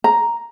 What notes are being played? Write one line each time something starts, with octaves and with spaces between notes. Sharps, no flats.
A#5